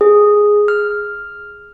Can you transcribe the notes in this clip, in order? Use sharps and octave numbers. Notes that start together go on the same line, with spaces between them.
G#4
F6